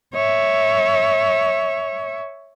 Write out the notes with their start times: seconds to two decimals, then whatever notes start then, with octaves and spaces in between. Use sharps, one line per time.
0.14 C#5 E5